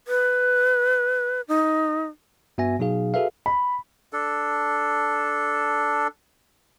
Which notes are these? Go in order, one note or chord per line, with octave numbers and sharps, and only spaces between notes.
B4
D#4
G2 B3 F#4 E5 G#5 A#6
B2 F#3 D#4 G#4 F5
F#4 G#4 A4 B4 E5 F5
B5
D4 A4